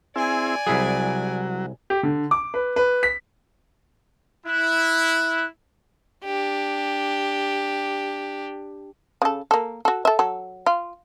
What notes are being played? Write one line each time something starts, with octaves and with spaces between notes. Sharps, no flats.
C4 E4 G#4 D5 G#5
C2 F#3 E4 G#4
G4
D3
D6
B4
B4
B6
E4 F#6
D4 G4
C#3 A4
A#3 A4
F#4 A4
A4 E5
F#3 A4
F4